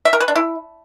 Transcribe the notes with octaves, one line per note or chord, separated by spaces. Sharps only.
E5
A#4
B4
D4
E4